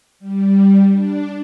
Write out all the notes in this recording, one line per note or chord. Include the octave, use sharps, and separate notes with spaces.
G3
D4